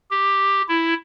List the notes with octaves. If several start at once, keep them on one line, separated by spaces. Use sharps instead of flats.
G4
E4